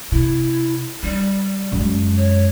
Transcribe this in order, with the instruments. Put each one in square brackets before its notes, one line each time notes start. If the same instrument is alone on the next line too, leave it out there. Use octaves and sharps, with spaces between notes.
[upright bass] C3 [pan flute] E4
[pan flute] G3 [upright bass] D#4
[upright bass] F#2 G#3
[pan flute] C#5